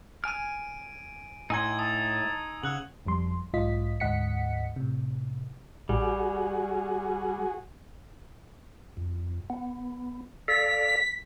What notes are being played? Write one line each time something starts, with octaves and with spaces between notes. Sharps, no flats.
G#5 F6 D7 D#7
A2 D#4 G#5 C6 E6 G#6
A5 D#6
C#3 F#5 E6 F#6 F#7
G1 F2 G3 C6
B1 G#2 F4 D#5 B6
D2 G#2 D#5 F#5 B6 C#7
A2 C3
A1 G3 F#4 G#4
F2
B3
A4 D5 F5 B6